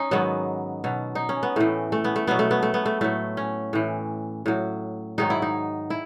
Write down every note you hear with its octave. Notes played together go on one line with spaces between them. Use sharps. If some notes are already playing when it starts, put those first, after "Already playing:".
Already playing: C#4 D#4
G#2 D#3 F#3 B3
B2 F#3
D#4
C#4
B3
A2 E3 A3
A3
B3
A3
B2 F#3 B3
A3
B3
A3
B3
A3
A2 F#3 A3
C#4
A2 E3
A2 F#3
G#2 D#3 F#3 D#4
E4
D#4
E4